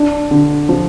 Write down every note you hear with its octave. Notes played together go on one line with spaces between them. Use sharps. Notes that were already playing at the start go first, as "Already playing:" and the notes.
Already playing: D4
D3
F3